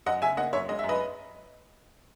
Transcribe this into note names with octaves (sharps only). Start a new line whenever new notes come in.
F#2 D#5 F#5
C#3 E5 G#5
A#3 D#5 F#5
F#2 C#5 E5
G#3 D#5
F#2 E5
B4 D#5